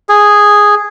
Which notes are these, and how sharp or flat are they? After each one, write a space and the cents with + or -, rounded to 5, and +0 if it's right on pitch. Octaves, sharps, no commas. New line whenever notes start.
G#4 -5